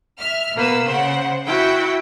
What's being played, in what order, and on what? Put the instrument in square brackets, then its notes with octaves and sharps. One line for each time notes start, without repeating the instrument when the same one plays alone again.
[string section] E5 F6
[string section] B2 E6 [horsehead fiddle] A#3 B4
[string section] C#3 F#5 [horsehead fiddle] C5
[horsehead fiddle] E4 F#4 [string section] G5